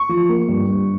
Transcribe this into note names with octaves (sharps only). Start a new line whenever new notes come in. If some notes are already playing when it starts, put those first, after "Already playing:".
Already playing: C#6
F3
A#3
G2
G2